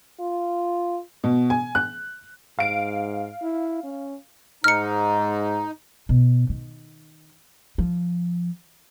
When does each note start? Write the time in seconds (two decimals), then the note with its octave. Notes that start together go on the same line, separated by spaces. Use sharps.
0.20 F4
1.24 B2
1.50 G#5
1.75 F#6
2.59 G#2 F5 D7
3.43 E4
3.84 C#4
4.64 G#2 D#4 F6 C#7
6.09 B2
6.49 D#3
7.78 F3